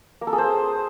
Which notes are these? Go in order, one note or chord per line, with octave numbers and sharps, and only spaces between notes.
A#3
A4
G#4
C5